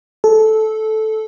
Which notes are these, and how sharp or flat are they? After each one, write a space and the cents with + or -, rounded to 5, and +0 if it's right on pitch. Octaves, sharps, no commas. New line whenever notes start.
A4 -15